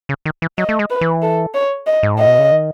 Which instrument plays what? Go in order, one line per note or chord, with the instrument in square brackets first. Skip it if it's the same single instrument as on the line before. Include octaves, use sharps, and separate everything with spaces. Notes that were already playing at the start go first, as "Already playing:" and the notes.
[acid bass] C#3
D#3
E3
[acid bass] F#3 [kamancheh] D#5
[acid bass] A3
G#3
[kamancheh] B4
[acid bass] E3
[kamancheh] A4
C#5
D#5
[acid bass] G#2
[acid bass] A2 [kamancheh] D#5
[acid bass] B2
C#3
D#3